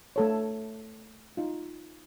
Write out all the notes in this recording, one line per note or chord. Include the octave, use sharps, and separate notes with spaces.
A3 A4 C#5
D#4 F4